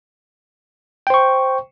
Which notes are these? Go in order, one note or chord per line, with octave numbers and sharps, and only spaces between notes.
C5 G5 C#6